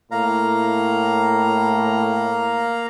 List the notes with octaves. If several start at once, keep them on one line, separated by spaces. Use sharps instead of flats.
A2 A#3 F5 A#5